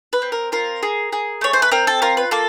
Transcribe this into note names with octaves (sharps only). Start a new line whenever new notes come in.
B4
C4
A#4
F4 A#4
G#4
G#4
A3 C#5
C5
B4
C4 A#4
A4
F4 A#4
B4
A#3 A4